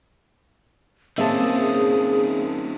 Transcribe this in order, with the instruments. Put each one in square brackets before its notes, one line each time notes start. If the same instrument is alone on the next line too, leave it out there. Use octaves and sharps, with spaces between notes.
[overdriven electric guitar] D#3 C#4 [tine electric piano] A#3 A5 [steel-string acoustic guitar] C4 E5 [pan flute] G#4